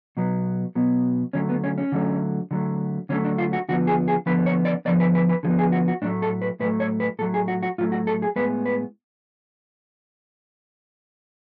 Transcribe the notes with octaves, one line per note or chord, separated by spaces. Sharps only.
B2 F#3 B3
B2 F#3 B3
D3 F#3 A3 C#4
B3
C#4
C#4
D3 F#3 A3
D3 F#3 A3
D3 F#3 A3 C#4
D4
F4
F#4
D3 F3 B3 F#4
G#4
G#4
D3 F3 B3 B4
C#5
D5
D3 F3 B3 D5
B4
B4
B4
D3 F3 B3 G#4
G#4
F#4
F#4
A2 F#3 A3 D4
A4
B4
A2 F#3 A3 B4
C#5
B4
A2 F#3 A3 A4
G#4
F#4
F#4
A2 F#3 A3 F4
F#4
A4
G#4
A2 G#3 B3 B4
B4